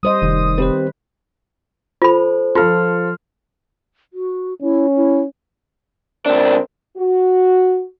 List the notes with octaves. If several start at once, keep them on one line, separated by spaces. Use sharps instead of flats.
G3 C5 D#5 D#6
F1 D#3
C4 G4 B4 C5
F4 A4 C5 B5
F3 F4 A4 C6 F6
F#4
C#4 E4
E4
C#2 C4 D4 A#4
F#4